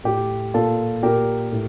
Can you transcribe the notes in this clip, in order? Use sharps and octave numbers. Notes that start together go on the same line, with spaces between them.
A2 G4
A#2 F4 A4
A#2 G4 A#4
A2